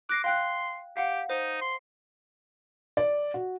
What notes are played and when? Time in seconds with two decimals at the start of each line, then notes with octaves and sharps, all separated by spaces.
0.09 D6 F#6 A#6 C7
0.24 F5 G5 C6 F#6
0.97 G4 F5 F#5
1.30 D#4 C5
1.61 C6
2.97 D5
3.34 F#4